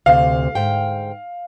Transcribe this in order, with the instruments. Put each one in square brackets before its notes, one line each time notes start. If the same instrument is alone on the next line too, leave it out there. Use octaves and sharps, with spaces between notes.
[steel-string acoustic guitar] D2 C3 [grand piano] F5
[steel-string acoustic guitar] G#2 G5